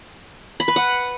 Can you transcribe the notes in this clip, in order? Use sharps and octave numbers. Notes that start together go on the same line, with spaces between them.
B5
B4
F#5